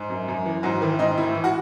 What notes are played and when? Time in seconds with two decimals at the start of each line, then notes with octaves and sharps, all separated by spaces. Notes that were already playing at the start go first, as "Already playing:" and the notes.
Already playing: G#2
0.10 F#2
0.28 F#2
0.46 E3
0.63 G#2 F#3 F#4
0.81 D#3 E3 E4
0.99 G#2 D#4 D#5
1.17 A2 E4 E5
1.35 E3
1.44 F#4 F#5